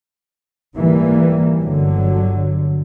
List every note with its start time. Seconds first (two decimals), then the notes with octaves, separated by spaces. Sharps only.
0.77 G#2 E3 G3 A#3
1.60 G1 D3 F#3